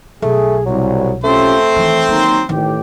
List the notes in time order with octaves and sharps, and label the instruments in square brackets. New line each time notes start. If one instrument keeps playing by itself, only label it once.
[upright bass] B1 [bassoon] A3 [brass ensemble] G#4
[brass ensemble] C2 [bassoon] F#3
[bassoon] A3 [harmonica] C4 C5 [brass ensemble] C#4 F4 G4
[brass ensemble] A2 [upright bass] D#3 E3
[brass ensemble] D#3 F#3 A#5 [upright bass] A#3
[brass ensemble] A1 G4 G5 [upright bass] D#3